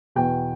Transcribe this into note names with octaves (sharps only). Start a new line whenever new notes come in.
E2 B2 G5